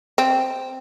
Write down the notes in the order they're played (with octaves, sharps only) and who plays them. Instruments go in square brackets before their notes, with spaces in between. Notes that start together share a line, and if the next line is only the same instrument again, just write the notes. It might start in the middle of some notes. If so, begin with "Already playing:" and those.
[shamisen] C4